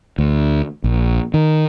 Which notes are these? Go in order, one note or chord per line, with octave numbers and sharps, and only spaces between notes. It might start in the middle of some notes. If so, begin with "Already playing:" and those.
D2
A#1
D#3